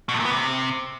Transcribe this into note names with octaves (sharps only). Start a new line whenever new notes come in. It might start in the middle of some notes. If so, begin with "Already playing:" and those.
B2
A2
A#2
B3
C3